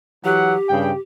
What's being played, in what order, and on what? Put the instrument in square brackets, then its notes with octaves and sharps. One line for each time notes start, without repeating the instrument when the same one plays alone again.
[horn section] E3 F#3 F#5 [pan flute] G4
[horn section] G2 C#3 G5